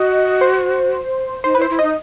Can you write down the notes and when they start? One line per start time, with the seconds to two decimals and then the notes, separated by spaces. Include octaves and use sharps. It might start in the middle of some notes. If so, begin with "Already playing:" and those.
Already playing: F#4 D#5
0.41 C5
1.44 D#4 C5
1.55 E4 B4
1.62 C5
1.70 E4
1.79 D#4 D#5